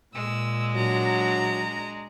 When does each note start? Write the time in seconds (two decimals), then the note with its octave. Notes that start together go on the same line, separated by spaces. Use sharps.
0.15 A#2 G#3 E6
0.75 F#3 D4 A#5